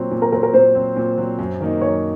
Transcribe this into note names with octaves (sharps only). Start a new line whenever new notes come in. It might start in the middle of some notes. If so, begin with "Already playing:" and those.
Already playing: A#2 F#3 C4
A#2
A#4
F#3 C4 A#4
A#4
A#2 C5
F#3 C4
A#2
F#3 C4
F#2
D#3 A#3 D#4
F#2 C#5